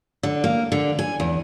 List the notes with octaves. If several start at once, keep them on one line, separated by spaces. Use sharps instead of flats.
D3
A#3
D3
G#5
E2